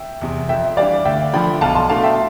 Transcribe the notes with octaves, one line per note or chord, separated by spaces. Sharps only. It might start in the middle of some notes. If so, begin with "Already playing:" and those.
Already playing: E5 G5
E2 C3
F2 E5 G5
E3 G3 D4 D5 F5
D2 E5 G5
D3 F3 G5 B5
B1 F5 A5
A5 C6
B2 A3 D4 F5 A5
E5 G5